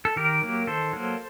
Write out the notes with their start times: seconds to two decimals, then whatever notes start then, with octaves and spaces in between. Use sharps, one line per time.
0.05 A4
0.16 D#3 G4 A#4
0.42 F#3 A#3
0.67 D#3 A4 C5
0.93 F#3 A#3